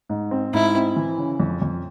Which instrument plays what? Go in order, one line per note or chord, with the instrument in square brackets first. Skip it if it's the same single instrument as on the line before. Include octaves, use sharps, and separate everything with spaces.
[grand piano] G#2
C4
[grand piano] G#2 [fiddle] E4
[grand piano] C4
E3
C#3
F2
F2